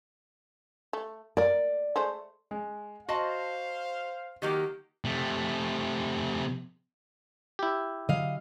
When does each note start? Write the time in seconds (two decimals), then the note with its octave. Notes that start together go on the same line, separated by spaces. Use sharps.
0.93 A3
1.37 A#3 A#4 D5
1.96 G#3 A3 C5
2.51 G#3
3.09 F#4 C5 D#5 F5 A5 C6
4.42 D#3 F#3 A#3 G4
5.05 C3 A3
7.59 E4 G4
8.09 D3 F#3 D#5 F5